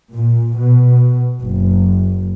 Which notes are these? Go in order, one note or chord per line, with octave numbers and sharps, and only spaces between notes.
A#2
B2
F#1